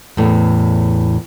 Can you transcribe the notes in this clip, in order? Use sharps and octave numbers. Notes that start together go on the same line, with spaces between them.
E2 A2